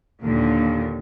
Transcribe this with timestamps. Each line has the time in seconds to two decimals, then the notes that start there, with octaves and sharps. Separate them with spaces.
0.24 D#2 A#2 D3